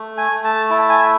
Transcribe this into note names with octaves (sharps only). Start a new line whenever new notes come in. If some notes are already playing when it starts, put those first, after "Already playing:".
Already playing: A3
G#5
A3
A5
E4 A5
A5
G#5